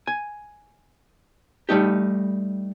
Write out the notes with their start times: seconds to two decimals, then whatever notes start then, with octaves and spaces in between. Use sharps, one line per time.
0.07 G#5
1.69 G3 A3 D#4 G4